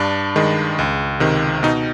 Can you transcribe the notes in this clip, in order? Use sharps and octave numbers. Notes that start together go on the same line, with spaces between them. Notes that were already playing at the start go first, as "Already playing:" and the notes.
Already playing: G2 D4
D#3 G#3
C#2
C3 D#3
B2 D#4